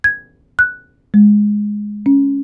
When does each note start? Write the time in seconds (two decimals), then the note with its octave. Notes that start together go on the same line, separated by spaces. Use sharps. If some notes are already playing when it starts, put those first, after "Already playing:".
0.04 G#6
0.59 F#6
1.14 G#3
2.06 C#4